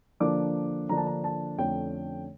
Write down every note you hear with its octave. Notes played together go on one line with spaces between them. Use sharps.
D3 F3 A#3 D4 D6
D3 F3 A#3 D4 A#5
A5
A#5
A5
F2 D3 A3 C#4 G5